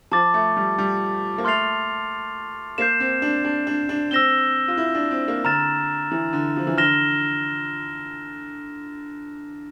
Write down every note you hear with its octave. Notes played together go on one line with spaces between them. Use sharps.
F3 A5 D6 A6
A3
G3
G3
A#3
A3 C6 F6 A6 C7 F7
A#3 G6 C7 E7
C4
D4
D4
D4
D4
C4 E6 A#6 E7 G7
F4
E4
D4
C4
A#3
D3 A#5 F6 A6 E7
E3
D3
F3
E3
D3 F6 A#6 E7 G7